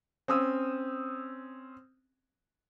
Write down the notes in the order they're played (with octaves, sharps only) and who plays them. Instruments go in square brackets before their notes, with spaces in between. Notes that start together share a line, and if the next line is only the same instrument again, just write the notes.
[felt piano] C4 C#4 D#6 E6